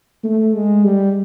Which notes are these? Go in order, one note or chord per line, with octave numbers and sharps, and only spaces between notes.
A3
G#3
G3